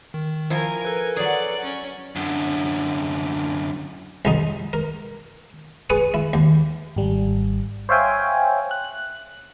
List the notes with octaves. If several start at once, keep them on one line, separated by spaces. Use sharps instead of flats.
D#3
F3 E4 A#4 G#5
A4 B4
F#3 G#4 D5 F#5
C#4
F#2 D3
C2 F2 D#4
A#4
G#4 B4 C#6 D#6
E4
D#2
G#1 G3
C5 C#5 E5 F5 G5 G#5
F#6